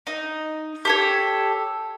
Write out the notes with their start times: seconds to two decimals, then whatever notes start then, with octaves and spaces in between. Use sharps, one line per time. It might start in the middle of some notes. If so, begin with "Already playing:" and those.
0.07 D#4
0.85 G4 A4 C#5